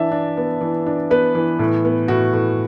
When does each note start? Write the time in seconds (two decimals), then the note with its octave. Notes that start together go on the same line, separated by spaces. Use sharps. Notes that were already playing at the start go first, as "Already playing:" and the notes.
Already playing: E3 D4 E5 A5
0.11 D4
0.37 B3
0.61 E3
0.86 D4
1.10 B3 B4
1.35 E3
1.59 A2
1.85 B3
2.08 A2 F#4
2.33 A2